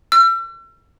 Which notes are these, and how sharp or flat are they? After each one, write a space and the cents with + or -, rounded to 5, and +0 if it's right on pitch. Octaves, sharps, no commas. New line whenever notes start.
E6 +40